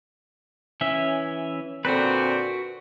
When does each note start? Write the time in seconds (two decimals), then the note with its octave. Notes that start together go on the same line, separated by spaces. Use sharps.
0.81 E3 C#4 E5
1.85 A#2 D3 C4 F#4 B4